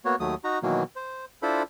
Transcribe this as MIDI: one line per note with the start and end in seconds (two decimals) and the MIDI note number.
0.05 0.15 58
0.05 0.15 59
0.05 0.15 66
0.05 0.15 73
0.20 0.35 39
0.20 0.35 54
0.20 0.35 57
0.20 0.35 87
0.44 0.59 63
0.44 0.59 66
0.44 0.59 82
0.63 0.83 47
0.63 0.83 51
0.63 0.83 52
0.63 0.83 54
0.63 0.83 58
0.96 1.25 72
1.42 1.63 62
1.42 1.63 64
1.42 1.63 65
1.42 1.63 69
1.42 1.63 72
1.42 1.63 83